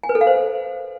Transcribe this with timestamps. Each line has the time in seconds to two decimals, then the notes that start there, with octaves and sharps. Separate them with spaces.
0.03 G#5
0.09 B4
0.15 A4
0.21 F5
0.27 C5